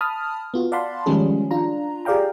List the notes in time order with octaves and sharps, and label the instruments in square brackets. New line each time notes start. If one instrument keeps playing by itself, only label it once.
[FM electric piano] A5 B5 D#6 F6
B3 F4 F#4
D5 F5 F#5 A5 B5 C6
D#3 F3 G3 G#3 C#4 G#4
D4 F4 A#5
G4 G#4 D5 F5 G5 A#5